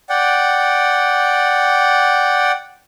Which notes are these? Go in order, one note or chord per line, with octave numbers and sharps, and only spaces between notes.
D5 F#5 G5